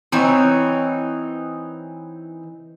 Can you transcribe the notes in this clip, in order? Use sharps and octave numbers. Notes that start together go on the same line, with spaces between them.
E3 C4 D#4 C#5